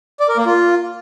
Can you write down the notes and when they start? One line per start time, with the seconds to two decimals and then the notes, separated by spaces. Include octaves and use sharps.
0.20 D5
0.28 A#4
0.37 A#3
0.46 F4